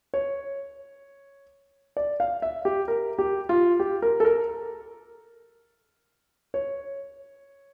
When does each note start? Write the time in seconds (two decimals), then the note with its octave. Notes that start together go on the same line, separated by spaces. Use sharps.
0.14 C#5
1.97 D5
2.20 F5
2.42 E5
2.65 G4
2.88 A#4
3.19 G4
3.49 F4
3.80 G4
4.02 A#4
4.20 A4
4.25 A#4
6.54 C#5